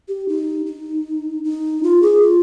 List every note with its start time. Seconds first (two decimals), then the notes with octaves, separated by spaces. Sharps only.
0.08 G4
0.29 D#4
0.66 D#4
1.44 D#4
1.83 F4
2.02 G#4
2.22 F4